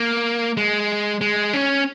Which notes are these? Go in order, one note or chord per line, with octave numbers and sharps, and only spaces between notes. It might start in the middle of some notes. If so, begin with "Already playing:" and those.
Already playing: A#3
G#3
G#3
C#4